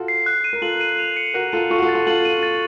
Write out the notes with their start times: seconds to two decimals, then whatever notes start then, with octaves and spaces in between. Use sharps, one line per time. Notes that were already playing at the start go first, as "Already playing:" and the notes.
Already playing: F4 F#4 A4
0.08 C7
0.26 F#6
0.44 D#7
0.53 A#4
0.62 F4 A4 F#7
0.81 D#7
0.99 F7
1.17 C#7
1.34 F#4 A#4 F#6
1.52 F4 A4 D#7
1.71 F4 A4 C#6
1.78 F#4
1.82 F4 A4
1.89 A6
1.94 F4 A4
2.07 F4 A4 F#7
2.25 D#7
2.43 A6